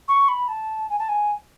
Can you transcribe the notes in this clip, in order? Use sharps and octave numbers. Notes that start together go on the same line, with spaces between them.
C#6
B5
A5
G#5
A5
G#5